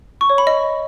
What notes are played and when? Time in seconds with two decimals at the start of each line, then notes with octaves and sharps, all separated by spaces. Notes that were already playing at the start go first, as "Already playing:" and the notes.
0.21 C#6
0.30 C#5
0.38 B5
0.47 D#5